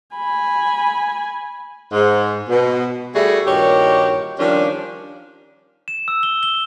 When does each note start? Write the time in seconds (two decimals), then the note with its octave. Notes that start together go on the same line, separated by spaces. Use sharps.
0.16 G#5 B5
1.93 G#2
2.48 B2
3.15 G3 A3 E4 F#4 G#4 E5
3.46 G2 A#2 D#3 F#4 G4 C#5
4.38 D#3 F3 G3 C#4 D4 F4
5.88 E7
6.08 E6
6.23 G7
6.43 G7